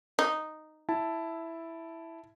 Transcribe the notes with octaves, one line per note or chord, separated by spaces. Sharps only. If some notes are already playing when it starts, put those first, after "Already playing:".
D#4
E4 A5